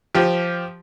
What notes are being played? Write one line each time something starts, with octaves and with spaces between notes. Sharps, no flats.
F3 G4